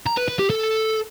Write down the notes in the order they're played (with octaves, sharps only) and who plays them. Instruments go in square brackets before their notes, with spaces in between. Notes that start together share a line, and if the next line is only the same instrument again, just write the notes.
[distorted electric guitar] A#5
B4
B4
G4
A4